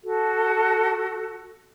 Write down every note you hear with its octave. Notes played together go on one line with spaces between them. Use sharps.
F#4 A4